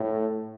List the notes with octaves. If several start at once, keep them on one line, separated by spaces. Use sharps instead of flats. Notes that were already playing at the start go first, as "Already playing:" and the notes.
Already playing: A2